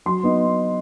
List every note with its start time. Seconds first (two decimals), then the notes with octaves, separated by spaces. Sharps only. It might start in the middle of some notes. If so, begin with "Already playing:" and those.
0.06 F#3 C6
0.23 B3 D#4